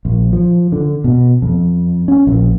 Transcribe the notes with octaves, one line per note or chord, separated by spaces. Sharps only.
A#1
F3
D3
B2
F2
C#4
A#1